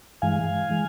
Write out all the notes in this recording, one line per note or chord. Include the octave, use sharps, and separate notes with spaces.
G2 E3 G#3 F5 G#5
E3 G#3